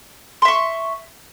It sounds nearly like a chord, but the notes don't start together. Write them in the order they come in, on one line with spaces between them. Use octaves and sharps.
C6 E5 C#6